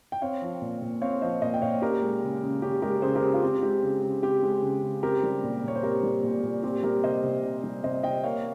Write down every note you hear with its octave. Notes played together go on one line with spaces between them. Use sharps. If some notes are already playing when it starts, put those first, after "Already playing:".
G5
C4 C#5 F5
F3
A#2
A#2
C4 C#5 F5
F3 C5 D#5
A#2 C5 D#5
G5
A#2 C#5 F5
C#4 G4 A#4
G#3
C#3
C#3
C#4 G4
G#3 G4 A#4
C#3 G#4 C5
G4 A#4
C#3
F4
C4 G4
G#3 G4
C#3
C#3
C4 G4
G#3
C#3
C#3
C4 G4 A#4
G3
A#2
A#2 C#5
C5
C4 G4 A#4
G3
A#2
A#2
C4 G4
G3 G4 A#4
C3 C5 D#5
C3
C4
G3
C3 C5 D#5
C3 D#5 G5
A#3 C#5 F5